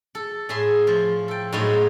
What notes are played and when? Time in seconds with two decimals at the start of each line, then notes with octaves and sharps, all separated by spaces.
0.15 A4
0.49 A2 G#4 E5 C6
0.87 F3 F4
1.28 A4 G5
1.52 A2 F#3 G#3 C#4 D#4 F4